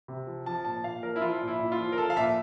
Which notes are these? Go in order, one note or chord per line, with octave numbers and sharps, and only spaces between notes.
C3
F3
F3 A5
A#2 A5
A#2 F5
F3 A#4
E4
F3 F4
A#2
E4
A#2
F4
F3
A#4
F3 A4
F5
A#2 E5